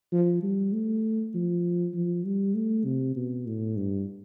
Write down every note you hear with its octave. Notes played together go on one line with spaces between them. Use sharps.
F3
G3
A3
F3
F3
G3
A3
C3
B2
A2
G2